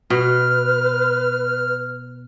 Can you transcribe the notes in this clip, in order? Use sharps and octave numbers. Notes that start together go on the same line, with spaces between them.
B2 B4 F6